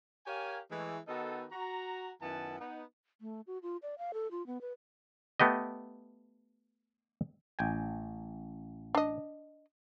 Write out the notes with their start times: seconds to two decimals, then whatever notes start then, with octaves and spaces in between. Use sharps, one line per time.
0.26 G4 A#4 C#5 F5 G#5
0.70 E3 G#3 A3
1.07 D#3 B3 D#4 F#4 A4
1.51 F#4 A#5
2.21 F#2 D#3 B3 E4 G#5 A5
2.59 B3 D#4
3.21 A3
3.47 F#4
3.63 F4
3.82 D5
3.98 F5
4.14 A4
4.31 F4
4.47 B3
4.61 B4
5.40 A3 B3 G4 D#5
7.59 A1 G5 G#5
8.95 D4 D#5